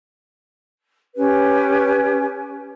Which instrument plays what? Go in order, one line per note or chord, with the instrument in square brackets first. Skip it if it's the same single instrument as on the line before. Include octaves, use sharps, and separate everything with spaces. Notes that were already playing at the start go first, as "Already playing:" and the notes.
[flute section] C#4 G4 B4